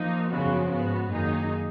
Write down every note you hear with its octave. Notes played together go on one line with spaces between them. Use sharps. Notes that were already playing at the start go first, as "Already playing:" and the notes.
Already playing: F3 A#3 D#4
F#2 C#3 F3 B3 F#4
G#2 F3 B3 F#4
F#2 D#3 A#3 D#4 G#4